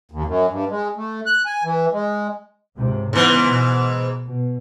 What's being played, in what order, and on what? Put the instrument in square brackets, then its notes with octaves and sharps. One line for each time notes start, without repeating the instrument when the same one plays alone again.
[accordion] D#2
F#2
G2
G#3
A3
F#6
G#5
E3
G#3
[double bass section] C#2 G#2 C3
[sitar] G#2 E3 [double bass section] C#3 B3
[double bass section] B2
B2